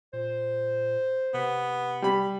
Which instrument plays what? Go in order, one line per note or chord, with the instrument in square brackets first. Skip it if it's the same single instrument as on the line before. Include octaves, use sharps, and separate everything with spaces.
[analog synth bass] A#2 [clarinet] C5
[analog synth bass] C3 [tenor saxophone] B3
[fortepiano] G3 B5